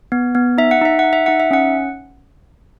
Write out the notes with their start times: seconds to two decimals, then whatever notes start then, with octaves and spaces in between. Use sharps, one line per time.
0.12 B3
0.35 B3
0.58 D#4 E5
0.71 F#5
0.82 D#4 E5
0.99 D#4 F#5
1.13 E5
1.26 D#4 F#5
1.40 E5
1.51 C#4 F#5